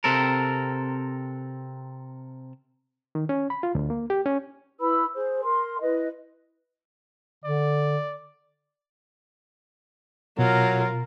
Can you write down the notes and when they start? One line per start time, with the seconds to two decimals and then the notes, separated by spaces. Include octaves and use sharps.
0.04 C3 C4 A4 A#4
3.15 D#3
3.29 C#4
3.50 B5
3.63 F4
3.75 D2
3.90 A#3
4.10 G4
4.26 C#4
4.80 E4 B4 B5 E6
5.14 G#4 C5
5.43 A#4 C6
5.80 E4 B4 D#5
7.44 D3 D5
10.39 B2 F#3 F4 A#4